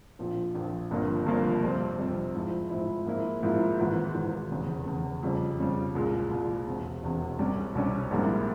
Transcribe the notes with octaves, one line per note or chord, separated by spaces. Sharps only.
A#1 A#2 F3
A#1 A#2 F3
G1 G2 F3 A#3
G1 G2 F3 A#3
F2 C3 G3 C4
F2 C3 G3 C4
G#2 F3 G#3 E4
G#2 F3 G#3 E4
G#2 F3 A#3 E4
G#2 F3 A#3 E4
G#1 G#2 E3
G#1 G#2 E3
F1 E2 C#3
F1 E2 C#3
F2 C#3 G3
F2 C#3 G3
C2 A#2 G#3
C2 A#2 G#3
E1 E2 C3
E1 E2 C3
C2 C3 G3 C#4
C2 C3 G3 C#4
A#1 G#2 G3 A#3 E4